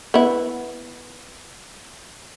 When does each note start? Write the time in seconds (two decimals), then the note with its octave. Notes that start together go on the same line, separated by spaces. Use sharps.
0.14 B3 E4